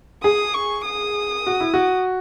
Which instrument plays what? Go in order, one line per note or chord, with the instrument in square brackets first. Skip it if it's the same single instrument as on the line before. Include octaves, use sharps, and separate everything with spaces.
[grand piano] G#4 [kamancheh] D#6
[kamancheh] C#6
D#6
[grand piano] F#4
E4
F#4